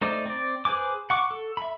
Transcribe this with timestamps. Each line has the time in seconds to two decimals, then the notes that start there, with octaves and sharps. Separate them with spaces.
0.02 A3 D#4 C5 D5 D6
0.26 C4 D5
0.65 G#4 B4 C5 G#5 D6
1.10 F#5 C#6 D6
1.31 A4
1.57 E5 B5